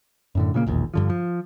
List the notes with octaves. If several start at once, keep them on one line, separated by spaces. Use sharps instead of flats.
F#2 A2 D3
A#2 C#3 A3 A#3
E1 A#1 D#2
G2 D3 F3
F3